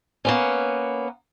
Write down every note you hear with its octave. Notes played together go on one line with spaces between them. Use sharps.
A#3 B3 C#4